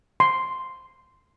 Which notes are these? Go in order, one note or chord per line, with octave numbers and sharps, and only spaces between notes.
C6